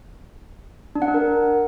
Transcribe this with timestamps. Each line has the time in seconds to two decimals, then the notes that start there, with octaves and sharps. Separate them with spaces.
0.95 D4
1.02 F#5
1.08 D4
1.14 A#4